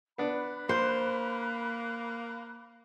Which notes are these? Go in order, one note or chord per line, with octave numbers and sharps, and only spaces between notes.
B3 D4 B5 F#6
A#3 C5